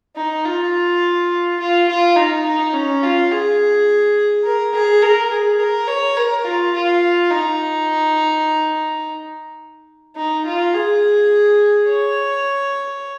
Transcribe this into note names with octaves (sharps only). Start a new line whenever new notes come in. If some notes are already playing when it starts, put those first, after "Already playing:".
D#4
F4
F4
F4
D#4
D#4
C#4
F4
G#4
A#4
G#4
A#4
G#4
A#4
C#5
A#4
F4
F4
D#4
D#4
F4
G#4
C#5